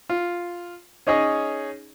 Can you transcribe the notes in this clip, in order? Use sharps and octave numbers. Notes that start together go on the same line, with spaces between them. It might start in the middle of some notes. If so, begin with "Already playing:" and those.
F4
C#4 D#4 G#4 C#5 D#5